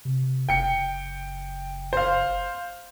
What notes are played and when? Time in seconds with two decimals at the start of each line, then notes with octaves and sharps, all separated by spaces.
0.05 C3
0.49 F#1 G5 C#7
1.93 C5 F5